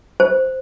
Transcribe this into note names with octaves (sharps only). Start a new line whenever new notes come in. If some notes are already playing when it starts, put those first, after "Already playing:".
C5